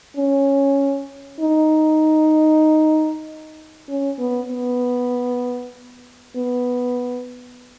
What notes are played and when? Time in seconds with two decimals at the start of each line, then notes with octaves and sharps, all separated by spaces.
0.17 C#4
1.40 D#4
3.89 C#4
4.19 B3
4.50 B3
6.36 B3